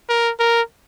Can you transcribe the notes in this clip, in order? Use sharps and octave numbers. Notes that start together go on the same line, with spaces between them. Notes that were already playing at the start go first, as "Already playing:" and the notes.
A#4
A#4